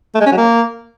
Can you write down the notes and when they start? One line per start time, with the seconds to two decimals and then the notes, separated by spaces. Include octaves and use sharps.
0.15 A3
0.21 G#3
0.26 C#4
0.32 F#3
0.37 A#3